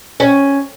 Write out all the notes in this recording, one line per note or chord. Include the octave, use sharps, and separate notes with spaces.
C#4